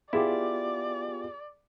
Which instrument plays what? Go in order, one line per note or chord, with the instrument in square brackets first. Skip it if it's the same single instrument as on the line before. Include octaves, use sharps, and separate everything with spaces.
[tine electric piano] B3 F4 G4 [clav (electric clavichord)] E4 [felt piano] G#4 [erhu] D5